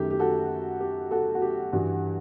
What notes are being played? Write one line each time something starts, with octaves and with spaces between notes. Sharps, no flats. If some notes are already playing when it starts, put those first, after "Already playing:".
Already playing: F#2 D#3 A3 G4
G4
F#4 A4
G4
F#4 A4
F#4
G4
G2 E3 G3 F#4